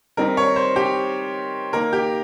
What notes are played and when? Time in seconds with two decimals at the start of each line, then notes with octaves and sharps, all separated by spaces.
0.17 D#3 G3 C4 D#4 A#4
0.37 C#5
0.56 C5
0.76 G4
1.73 D#3 A#3 D#4 A#4
1.93 G4